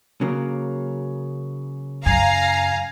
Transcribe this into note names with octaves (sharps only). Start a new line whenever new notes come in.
C#3 F#3 A#3
F#2 F5 G#5 A#5